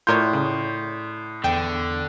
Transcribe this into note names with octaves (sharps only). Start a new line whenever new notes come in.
A2 F4 A#4 C#5 D5 C6 G6
C#3
E2 D3 G5